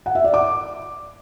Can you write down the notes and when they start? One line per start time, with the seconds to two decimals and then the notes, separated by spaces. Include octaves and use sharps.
0.06 F#5
0.15 E5
0.24 D5
0.34 D6